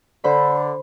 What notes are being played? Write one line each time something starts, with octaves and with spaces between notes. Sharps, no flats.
D3 C5 B5